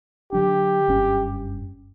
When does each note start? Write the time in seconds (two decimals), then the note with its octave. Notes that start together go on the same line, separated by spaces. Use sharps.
0.33 D3 F#3 D4 G4
0.88 F#1 G2 C#4